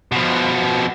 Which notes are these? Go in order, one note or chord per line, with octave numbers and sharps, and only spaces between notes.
B2 F3